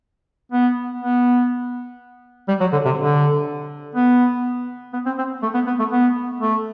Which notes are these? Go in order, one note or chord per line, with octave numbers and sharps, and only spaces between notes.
B3
B3
G3
F#3
D3
C3
D3
B3
B3
C4
C4
A3
B3
B3
A3
B3
A3